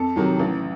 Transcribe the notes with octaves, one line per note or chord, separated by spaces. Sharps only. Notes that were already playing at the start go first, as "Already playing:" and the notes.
Already playing: F2 A4
C3 D#3 F#3
A1